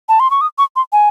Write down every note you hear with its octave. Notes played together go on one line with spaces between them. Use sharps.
A5
C6
C#6
D#6
C#6
C6
G#5